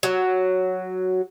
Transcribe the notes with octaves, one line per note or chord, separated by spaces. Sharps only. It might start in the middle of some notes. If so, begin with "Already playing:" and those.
F#3